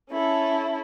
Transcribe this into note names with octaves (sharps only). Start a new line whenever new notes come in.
C#4 E4 A4